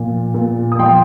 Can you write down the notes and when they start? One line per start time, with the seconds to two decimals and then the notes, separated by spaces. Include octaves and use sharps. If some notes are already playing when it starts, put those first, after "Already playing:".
Already playing: A#2 F3
0.34 A#2
0.72 D#6
0.79 F3 G5 C6